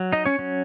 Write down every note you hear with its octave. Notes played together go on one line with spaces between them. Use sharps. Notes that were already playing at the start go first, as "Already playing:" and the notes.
Already playing: F#3
D#4 D#5
C#4 C#5
F#3 C#4